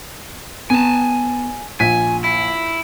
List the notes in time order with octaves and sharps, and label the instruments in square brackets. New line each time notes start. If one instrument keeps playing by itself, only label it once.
[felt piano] B3 [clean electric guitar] G#5 A5
[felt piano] A#1 B6 [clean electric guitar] G#5
[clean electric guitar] E4